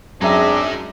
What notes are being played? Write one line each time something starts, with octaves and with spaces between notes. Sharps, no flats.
F#2 G#3 C4 D4 D#4 G#4 E5 A#5